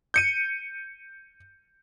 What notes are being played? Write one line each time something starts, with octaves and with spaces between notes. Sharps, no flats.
G6 C#7 D#7